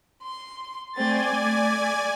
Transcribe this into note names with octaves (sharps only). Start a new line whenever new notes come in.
C6
A3 C4 D5 G#5 A6
A3